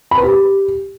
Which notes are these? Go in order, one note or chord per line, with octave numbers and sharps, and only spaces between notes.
B5
B4
G4